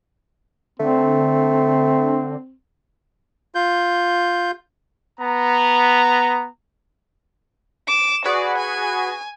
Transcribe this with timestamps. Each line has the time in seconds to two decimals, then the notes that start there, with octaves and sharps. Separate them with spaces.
0.80 D3 A3 C4
3.55 F4 G6
5.20 B3 A#5
7.88 D6 E7
8.26 F#4 G#4 B4 D5
8.58 G#5